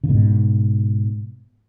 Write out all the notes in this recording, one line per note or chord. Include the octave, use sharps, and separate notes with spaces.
C#3
G#2 B2